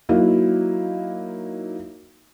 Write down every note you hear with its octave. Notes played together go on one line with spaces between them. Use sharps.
F#3 A#3 D#4 E4